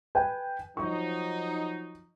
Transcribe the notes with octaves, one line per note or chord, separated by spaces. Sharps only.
B4 G5 G#5
F3 F#3 D#4 C#6